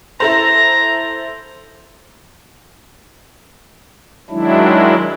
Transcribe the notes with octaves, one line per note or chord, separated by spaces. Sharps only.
E4 A4 C5 A#5
D#3 F#3 G#3 D4 E4